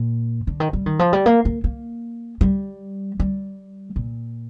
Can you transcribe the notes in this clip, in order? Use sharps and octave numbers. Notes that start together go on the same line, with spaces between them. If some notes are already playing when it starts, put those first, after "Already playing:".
Already playing: A#2
D3
D#3
G3
D#3
F3
G3
A#3
A#3
A#3
G3
G3
A#2